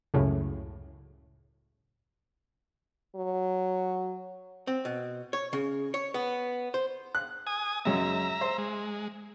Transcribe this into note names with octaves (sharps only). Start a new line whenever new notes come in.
C#2 F#2 A2 C#3
F#3
C4
B2
C#5
C#3
C#5
B3
C5
F#6
G#5 D#6
F#2 C#3 G#3 E5 A#5
C5
G#3